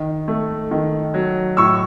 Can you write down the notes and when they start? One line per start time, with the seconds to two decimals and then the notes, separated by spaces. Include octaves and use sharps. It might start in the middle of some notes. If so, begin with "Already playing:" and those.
Already playing: D#3
0.28 A3
0.71 D#3
1.14 F#3
1.57 A2 C#6 E6